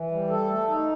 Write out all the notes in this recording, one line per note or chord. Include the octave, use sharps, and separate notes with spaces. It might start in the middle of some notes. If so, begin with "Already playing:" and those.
Already playing: E3
G3
A4
A3
D#4